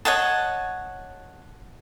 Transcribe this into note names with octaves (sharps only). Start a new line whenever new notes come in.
C#5 D#5 F#5 A5